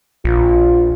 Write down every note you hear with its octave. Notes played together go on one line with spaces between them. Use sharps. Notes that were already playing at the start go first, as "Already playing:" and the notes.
A#1 F4